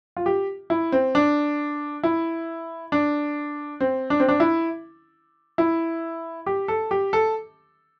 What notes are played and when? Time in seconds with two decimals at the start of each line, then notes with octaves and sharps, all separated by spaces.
0.17 F4
0.26 G4
0.70 E4
0.92 C4
1.15 D4
2.03 E4
2.92 D4
3.80 C4
4.10 D4
4.20 C4
4.28 D4
4.40 E4
5.58 E4
6.46 G4
6.68 A4
6.91 G4
7.13 A4